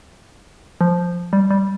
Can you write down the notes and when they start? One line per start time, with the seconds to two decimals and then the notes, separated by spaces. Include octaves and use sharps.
0.81 F3
1.33 G3
1.51 G3